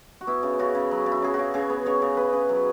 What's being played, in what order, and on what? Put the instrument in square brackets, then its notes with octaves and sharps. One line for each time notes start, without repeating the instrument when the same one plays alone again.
[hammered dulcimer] F#4
B3 E4
C#3
C#3 F#4
C#3
F#3
C#3
E4
C#3 G#4
F#4
C#3
C#3 G#4
B3
C#3 C#5
C#3
B3 B4
C#3
F#3